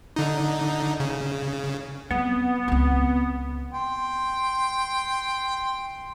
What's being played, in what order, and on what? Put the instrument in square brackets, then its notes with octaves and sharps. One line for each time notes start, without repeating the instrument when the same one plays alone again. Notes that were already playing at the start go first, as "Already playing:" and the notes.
[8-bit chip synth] D3 D#4
C#3
[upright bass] F#3 C4 [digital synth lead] B3
[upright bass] C#2 C4
[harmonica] G5 C6